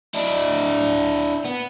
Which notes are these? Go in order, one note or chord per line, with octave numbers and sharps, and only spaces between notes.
D4 E4
B3